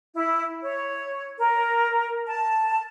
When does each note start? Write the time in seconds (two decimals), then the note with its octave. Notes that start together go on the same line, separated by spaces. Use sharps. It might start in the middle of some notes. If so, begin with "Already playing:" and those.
0.16 E4
0.63 C#5
1.39 A#4
2.27 A5